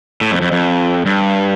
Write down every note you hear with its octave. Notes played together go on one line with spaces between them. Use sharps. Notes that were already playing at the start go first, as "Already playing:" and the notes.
A2
F2
F2
F2
G2